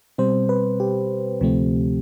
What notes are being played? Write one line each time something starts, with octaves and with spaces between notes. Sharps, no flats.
B2 G3 C4 C5
B4
G4
D2 C3 F3 A3 C4